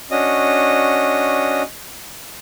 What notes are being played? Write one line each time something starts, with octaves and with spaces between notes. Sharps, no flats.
C#4 D4 F#4 D#5